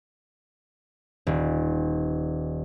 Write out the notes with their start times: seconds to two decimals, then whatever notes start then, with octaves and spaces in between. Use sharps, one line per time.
1.27 D#1